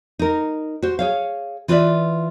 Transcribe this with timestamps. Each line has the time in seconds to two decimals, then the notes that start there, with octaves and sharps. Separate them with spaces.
0.19 D#4 A#4
0.82 F#4 C5
0.99 G#4 C#5 F5
1.68 E3 F4 B4 C#5 D5 E5